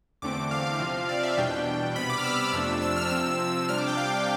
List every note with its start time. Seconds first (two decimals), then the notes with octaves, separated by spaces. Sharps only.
0.22 E2 D3 A3 C4 D6
0.51 F5
0.80 C3 F3 C4
1.09 D5
1.23 E5
1.37 E2 B2 G3 D4 G5
1.95 C3 G3 B3 B5
2.10 D6
2.18 F6
2.24 E6
2.53 F2 C3 F3 A3 D4
2.82 E6
2.97 F6
3.10 C3 F3 C4 E6
3.68 C3 G3 D4 F6
3.78 D6
3.88 G5
3.97 F5